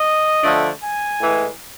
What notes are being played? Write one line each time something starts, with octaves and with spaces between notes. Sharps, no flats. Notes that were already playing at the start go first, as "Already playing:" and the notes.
Already playing: D#5
D3 F3 A3 D4
G#5
A2 E3 G#3